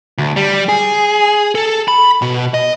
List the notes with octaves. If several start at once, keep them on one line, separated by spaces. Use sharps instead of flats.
D2
G3
G#4
A4
B5
B2
D#5